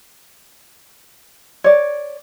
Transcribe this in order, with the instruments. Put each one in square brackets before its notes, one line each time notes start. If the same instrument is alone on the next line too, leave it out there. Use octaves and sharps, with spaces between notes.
[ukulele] C#5 D5